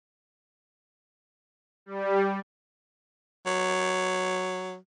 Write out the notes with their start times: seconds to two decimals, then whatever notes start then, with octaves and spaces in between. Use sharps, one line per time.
1.86 G3
3.46 F#3